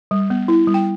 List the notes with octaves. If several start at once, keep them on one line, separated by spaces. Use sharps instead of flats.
G3
B3
E4
G3
G5